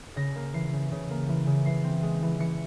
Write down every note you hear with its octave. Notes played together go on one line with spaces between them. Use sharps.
C#3 A#6
A#3
E3 C7
C#3
C#3
A#3
E3
C#3
E3 C7
C4
G#3
E3
E3 C#7